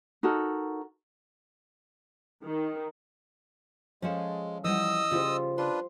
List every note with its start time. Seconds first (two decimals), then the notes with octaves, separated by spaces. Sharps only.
0.23 D#4 F#4 A4 A#4
2.44 D#3
4.02 F3 G#3 C#4 G#4 A4 F5
4.64 E3 F3 G3 D#5 F#5 D#6 E6
5.11 C#3 F3 G3 F4
5.58 D4 F4 B4 C6